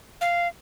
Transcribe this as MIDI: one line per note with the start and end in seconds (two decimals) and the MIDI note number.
0.21 0.48 77